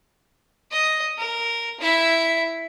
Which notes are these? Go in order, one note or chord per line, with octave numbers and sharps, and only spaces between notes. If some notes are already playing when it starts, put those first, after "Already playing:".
D#5
A#4
E4 E5